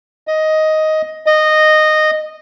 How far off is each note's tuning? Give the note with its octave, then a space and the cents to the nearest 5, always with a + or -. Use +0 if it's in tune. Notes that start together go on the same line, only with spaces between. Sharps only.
D#5 +5
D#5 -15